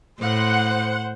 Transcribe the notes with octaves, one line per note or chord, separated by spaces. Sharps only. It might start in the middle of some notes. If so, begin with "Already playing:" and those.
A2 C5 F#5